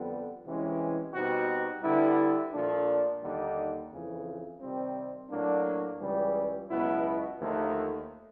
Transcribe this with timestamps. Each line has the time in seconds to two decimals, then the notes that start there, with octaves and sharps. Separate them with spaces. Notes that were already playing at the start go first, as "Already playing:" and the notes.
Already playing: F2 D3 G3 B3
0.44 C2 C3 E3 G#3 C#4
1.13 B2 G3 C4 D#4 F#4
1.83 D3 G3 B3 E4
2.53 A#2 F3 A3 D4
3.22 D#2 D3 G3 A#3 D#4
3.91 F2 C#3 E3
4.61 C3 D#3 G3 C4
5.30 A2 F#3 A#3 D4
5.99 C#2 C#3 E3 G3
6.69 C#2 B2 F#3 B3 E4
7.38 D#2 D3 F3 A3